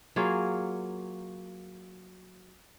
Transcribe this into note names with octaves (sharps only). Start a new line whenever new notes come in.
F#3 A#3 F4 G#4